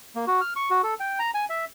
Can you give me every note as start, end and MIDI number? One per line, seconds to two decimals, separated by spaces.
0.15 0.25 58
0.27 0.41 66
0.41 0.53 89
0.56 0.69 85
0.70 0.82 66
0.83 0.94 69
1.00 1.19 79
1.19 1.31 82
1.34 1.45 80
1.50 1.65 76